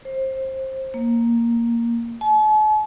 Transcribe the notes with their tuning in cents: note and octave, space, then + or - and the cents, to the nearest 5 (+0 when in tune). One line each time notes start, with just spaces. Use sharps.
C5 +20
A#3 +0
A5 -45